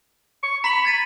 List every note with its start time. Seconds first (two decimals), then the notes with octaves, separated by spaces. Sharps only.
0.43 C#6
0.64 A#5 B5 B6 F#7
0.85 G#6 A6 D#7